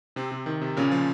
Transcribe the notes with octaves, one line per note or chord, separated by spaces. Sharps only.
C3 C4
C3
D#3
C3
A#2 C#3 C#4
F3